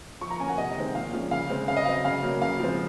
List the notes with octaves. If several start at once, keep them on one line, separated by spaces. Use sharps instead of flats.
F3 C#6
A#5
A#3 C#4 G#5
F#5
C3 D#5
D#3 G#3 C4
A#2 F5
F3 G#3 C#4
C#3 F5
G#3 C4
C#3 F5
D#5
F#3 C4 F5
C#3 F5
F#3 A#3 C#4
C#3 F5
F3 G#3 C4